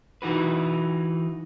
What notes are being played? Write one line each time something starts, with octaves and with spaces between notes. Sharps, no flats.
E3 D#4 F#4 B4